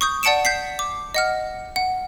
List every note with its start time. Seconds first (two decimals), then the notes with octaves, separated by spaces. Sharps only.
0.01 C#6 D#6 G6
0.23 D5 F#5 A5 C#7 D7 E7
0.45 G6 B6 C7
0.79 D6
1.14 D#5 F#5 F6
1.76 F#5